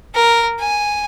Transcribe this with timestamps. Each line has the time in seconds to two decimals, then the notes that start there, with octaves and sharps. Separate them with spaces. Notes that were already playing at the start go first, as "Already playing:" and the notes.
0.15 A#4
0.59 G#5